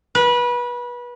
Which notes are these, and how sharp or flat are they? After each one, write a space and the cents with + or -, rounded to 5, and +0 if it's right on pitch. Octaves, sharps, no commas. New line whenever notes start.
B4 -25